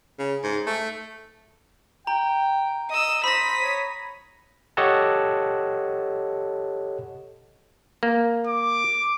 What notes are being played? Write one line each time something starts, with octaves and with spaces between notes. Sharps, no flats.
C#3
G#2
A3
G5 A#5
D#5 D#6 E6
C5 B5 D#6 A#6 B6
C#5
G4 A4 C#5 D#5 F#5 A5
A#3
D6